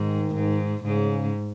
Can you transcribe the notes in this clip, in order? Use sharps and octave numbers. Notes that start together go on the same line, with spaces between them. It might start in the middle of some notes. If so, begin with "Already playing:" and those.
Already playing: G#2 D#3
G#2
G#2 C#3